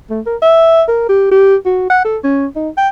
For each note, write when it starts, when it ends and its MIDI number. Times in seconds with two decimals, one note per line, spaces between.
0.10 0.21 57
0.26 0.36 70
0.42 0.83 76
0.88 1.08 70
1.09 1.29 67
1.31 1.56 67
1.66 1.89 66
1.90 2.00 78
2.05 2.18 69
2.24 2.46 61
2.56 2.69 63
2.77 2.89 79